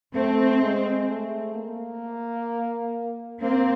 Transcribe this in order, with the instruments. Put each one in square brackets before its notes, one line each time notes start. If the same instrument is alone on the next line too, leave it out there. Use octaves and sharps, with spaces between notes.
[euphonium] A3 [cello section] C4
[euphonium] G#3
A3
A#3
[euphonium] A#3 [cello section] C4